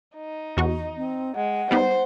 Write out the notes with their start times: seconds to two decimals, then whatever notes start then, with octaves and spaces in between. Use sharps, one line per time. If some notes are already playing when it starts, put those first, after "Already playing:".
0.16 D#4
0.57 E2 F#4 C#6
0.97 C4
1.35 G#3 F#5
1.71 G3 B3 D#4 C5